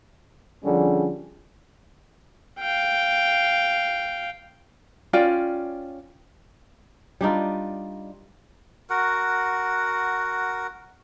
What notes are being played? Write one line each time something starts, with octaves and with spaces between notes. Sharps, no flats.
F2 D3 F3 G3 C#4 G#4
F5 G5
C#4 F4 D5 G5
G3 D4 D#4 F4
F#4 A#4 F#5